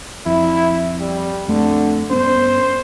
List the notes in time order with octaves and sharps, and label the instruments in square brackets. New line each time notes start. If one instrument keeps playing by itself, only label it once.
[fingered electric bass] F2 [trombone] E4
[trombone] G3
[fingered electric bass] F2 A3 C4 [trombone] D3
[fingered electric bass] G2 B3 C#4 [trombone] C5